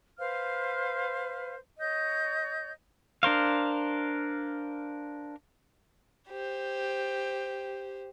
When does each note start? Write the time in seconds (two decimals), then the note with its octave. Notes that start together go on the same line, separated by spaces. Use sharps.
0.18 B4 C5 F5 F6
1.79 C#5 D#5 G6
3.23 D4 A#4 C5 F5
6.28 G4 C5